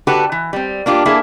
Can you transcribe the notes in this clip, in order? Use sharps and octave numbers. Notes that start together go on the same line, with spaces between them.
D3 F#4 G4 A4 B4
E3
G3 C4
A#3 D4 F4 G4
A#3 E4 G#4 A4